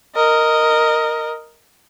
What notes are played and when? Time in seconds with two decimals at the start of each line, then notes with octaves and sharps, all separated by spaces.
0.16 A#4 D#5